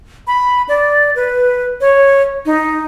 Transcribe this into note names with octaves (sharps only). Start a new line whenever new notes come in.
B5
D5
B4
C#5
D#4